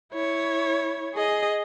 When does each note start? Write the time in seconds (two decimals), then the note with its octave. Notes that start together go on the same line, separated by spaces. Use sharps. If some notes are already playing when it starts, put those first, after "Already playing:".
0.13 E4 C#5
1.15 G#4 D#5